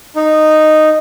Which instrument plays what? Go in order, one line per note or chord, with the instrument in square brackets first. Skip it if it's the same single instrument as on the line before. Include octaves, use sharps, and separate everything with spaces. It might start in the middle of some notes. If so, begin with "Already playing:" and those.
[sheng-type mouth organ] D#4